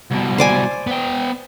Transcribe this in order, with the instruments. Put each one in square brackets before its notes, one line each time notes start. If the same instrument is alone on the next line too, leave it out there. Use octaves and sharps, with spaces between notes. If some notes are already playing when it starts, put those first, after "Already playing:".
[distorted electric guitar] C2 B2
[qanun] C5 D5 G#5
[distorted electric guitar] B3 G5